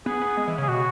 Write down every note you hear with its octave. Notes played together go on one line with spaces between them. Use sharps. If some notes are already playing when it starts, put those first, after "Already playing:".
B3 G#4
B3
G#3
E3
C#3
G#4
B2 F#4